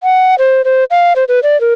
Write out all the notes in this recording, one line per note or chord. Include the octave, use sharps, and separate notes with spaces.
F#5
C5
C5
F5
C5
B4
D5
A#4